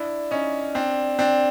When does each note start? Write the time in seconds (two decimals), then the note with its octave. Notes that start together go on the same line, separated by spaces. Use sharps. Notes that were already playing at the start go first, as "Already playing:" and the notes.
Already playing: D4 E4
0.31 C#4 D#4
0.75 C4 D4
1.19 C4 D4